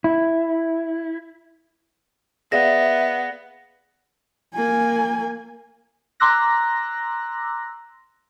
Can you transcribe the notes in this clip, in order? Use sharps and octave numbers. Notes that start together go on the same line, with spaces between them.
E4
B3 G#4 D5 E5 F5 A#6
A#3 G#5
A#5 C6 D6 E6 F#6 A#6